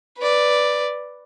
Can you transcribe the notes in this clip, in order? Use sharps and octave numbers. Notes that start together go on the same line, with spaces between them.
B4 D5